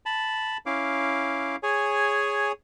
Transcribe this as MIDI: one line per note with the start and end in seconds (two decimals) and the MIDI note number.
0.06 0.57 81
0.06 0.57 83
0.66 1.56 61
0.66 1.56 64
0.66 1.56 77
0.66 1.56 86
1.63 2.52 68
1.63 2.52 73
1.63 2.52 80